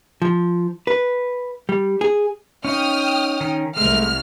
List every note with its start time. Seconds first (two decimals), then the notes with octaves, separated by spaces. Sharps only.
0.22 F3
0.87 B4
1.69 G3
2.01 G#4
2.65 C#4 D#4 F5 G5 D#6 F6
3.41 D#3 C#4
3.76 C2 G#3 A3 F6